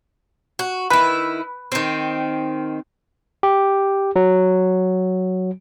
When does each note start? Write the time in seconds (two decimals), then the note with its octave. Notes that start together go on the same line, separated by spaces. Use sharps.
0.59 F#4
0.90 D#3 E4 B4
1.72 D#3 C4
3.43 G4
4.16 F#3